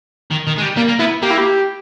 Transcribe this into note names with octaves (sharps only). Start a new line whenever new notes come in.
D#3
D#3
G#3
G3
G3 A#3
A#3
B3 E4
A#3 G4
E4
G4